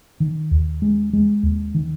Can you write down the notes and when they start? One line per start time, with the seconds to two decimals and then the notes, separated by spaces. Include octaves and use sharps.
0.20 D#3
0.51 D#2
0.82 G#3
1.13 G#3
1.43 D#2
1.75 D#3